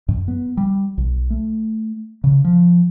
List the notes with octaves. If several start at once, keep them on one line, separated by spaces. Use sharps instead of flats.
F#2
B3
G3
B1
A3
C#3
F3